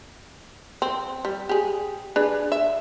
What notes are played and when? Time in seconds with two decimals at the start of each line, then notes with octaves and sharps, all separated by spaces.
0.82 C4
1.25 G3
1.49 G4 G#4
2.16 D4 G#4 B4
2.52 E5